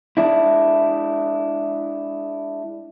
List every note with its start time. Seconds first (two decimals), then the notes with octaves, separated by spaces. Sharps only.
0.17 G#3 D4 E4